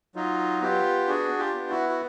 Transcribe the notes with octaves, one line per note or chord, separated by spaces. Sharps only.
F#3 D#4 F4
B3 F4 G4
D4 F#4 G#4
F4 G4
B3
E4 F#4
F#4